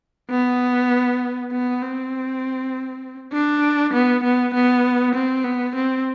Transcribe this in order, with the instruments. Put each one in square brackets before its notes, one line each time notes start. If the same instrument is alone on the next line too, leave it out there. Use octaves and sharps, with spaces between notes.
[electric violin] B3
B3
C4
D4
B3
B3
B3
C4
B3
C4